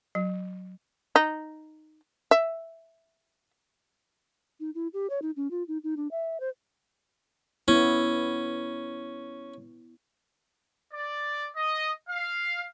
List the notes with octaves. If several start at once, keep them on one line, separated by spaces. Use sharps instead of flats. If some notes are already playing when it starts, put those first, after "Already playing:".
F#3
D#4
E5
D#4
E4
G4
C#5
D#4
C#4
F4
D#4
D#4
D4
E5
C5
B3 C#4 E4
D5
D#5
F5